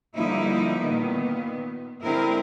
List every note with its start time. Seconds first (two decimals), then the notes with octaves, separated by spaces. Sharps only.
0.15 D3 F3 G3 A#3 D#4 E4
0.82 A#2 D#3 B3
2.04 D3 G#3 C4 E4 A#4